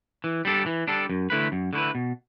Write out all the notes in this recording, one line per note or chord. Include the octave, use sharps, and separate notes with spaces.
E3
G3 D4 A4
E3
G3 D4 A4
F#2
D3 A3 E4 B4
F#2
D3 A3 E4 B4
B2